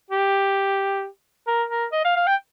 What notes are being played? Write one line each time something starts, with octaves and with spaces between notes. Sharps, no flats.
G4
A#4
A#4
D#5
F5
F5
G5